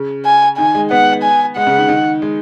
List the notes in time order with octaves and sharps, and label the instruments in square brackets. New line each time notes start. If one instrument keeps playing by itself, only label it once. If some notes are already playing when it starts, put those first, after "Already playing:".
Already playing: [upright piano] C#3
[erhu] G#5
[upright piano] D#3 [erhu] G#5
[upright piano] G#3
[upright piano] B3 [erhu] F#5
[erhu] G#5
[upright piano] G#3 [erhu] F#5
[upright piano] C#3
D#3
D#3
G#3